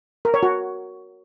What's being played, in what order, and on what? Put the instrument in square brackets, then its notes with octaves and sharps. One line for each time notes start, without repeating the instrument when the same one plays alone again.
[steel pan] A#4
C#5
F#4